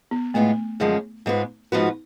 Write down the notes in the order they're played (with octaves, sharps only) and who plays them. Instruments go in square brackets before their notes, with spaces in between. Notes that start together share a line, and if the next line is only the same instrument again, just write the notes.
[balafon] B3
[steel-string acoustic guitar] A2 G#3 B3 F4 [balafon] A3
[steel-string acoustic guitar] F#2 D3 F3 G#3 C#4
G#2 G#3 B3 F4 B4
G#2 F3 B3 F#4 B4